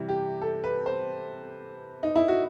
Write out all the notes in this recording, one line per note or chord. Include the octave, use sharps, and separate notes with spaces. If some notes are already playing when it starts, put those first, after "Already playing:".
Already playing: C3 E3 G3
G4
A4
B4
C5
D#4
E4
F#4